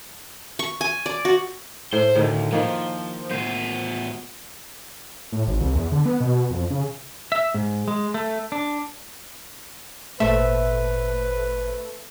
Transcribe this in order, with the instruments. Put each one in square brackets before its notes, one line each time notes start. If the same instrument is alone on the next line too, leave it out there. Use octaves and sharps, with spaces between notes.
[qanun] C#6
G#5
D5
F#4
[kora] A2 [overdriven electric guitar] C5
[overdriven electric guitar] D2 [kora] A2 D#3
[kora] D#3 A#3 A#4 [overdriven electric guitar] F3
[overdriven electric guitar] A2 B3 [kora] C5
[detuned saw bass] A2
G#1
C2
E2
D3
B3
B2
B2
F2
C#3
[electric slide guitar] E5
G#2
G#3
A3
D4
[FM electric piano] G#1 A#2 C5 [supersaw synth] A3 [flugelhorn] B4 [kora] E5